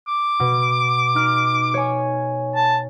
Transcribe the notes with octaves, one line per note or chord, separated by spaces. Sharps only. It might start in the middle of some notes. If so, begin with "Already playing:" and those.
D6
B2
D#4 F6
C#5 G#5
A5